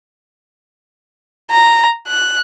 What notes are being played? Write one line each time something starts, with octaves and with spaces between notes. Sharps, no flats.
A#5
F#6